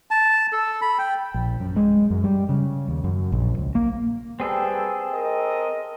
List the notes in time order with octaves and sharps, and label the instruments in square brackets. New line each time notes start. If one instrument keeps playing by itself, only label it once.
[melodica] A5
A4
B5
G5
[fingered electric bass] A#1
F#2
G#3
F#2
G3
C#3
D#2
F#2
A#1
C#2
A#3
[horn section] G3 B4 G5 [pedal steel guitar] C4 G#4 A4
[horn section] A#4 D#5